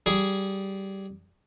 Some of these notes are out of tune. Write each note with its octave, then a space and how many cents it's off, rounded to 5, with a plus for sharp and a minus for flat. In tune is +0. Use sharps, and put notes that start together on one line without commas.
G3 -15 G#4 +0